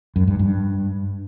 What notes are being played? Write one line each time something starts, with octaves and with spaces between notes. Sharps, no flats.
F#2
G2
G2